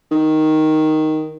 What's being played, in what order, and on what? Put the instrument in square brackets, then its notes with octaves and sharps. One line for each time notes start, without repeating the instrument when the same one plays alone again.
[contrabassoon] D#3